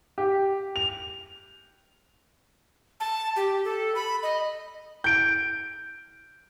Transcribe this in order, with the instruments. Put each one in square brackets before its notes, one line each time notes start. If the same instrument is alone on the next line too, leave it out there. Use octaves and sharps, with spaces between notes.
[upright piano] G4
F7
[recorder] A5
G4
A4
B5
D#5
[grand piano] G6 D7